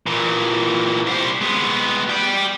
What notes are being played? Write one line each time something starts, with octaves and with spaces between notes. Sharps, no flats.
A#2 E3
G3 C5
G#3 B3
G3 G5